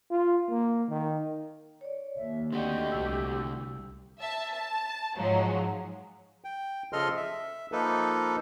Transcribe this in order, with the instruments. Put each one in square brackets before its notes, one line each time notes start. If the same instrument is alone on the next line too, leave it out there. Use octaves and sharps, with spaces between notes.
[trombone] F4
A#3
D#3
[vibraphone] C#5 D5
[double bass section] D#2 [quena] E5
[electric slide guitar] D3 A3 F#4 [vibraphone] C4 D5 D#5 [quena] G4
[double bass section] C2 [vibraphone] E6
[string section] E5 A5
A5
G#2 F3 F#3 G#3
[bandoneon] G5
C#3 F3 A4 D#5 C6 F6
E5
F3 A#3 D#4 A4 B4